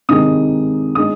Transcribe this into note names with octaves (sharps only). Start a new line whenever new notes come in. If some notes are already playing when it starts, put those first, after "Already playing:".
C3 D#3 G#3 D#4 D#6
G#3 D#4 D#6